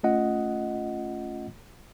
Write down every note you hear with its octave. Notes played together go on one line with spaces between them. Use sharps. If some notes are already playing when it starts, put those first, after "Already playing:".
A3 C#4 F4 D#5 F#5